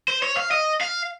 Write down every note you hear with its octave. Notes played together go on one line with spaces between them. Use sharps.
C5
C#5
F5
D#5
F5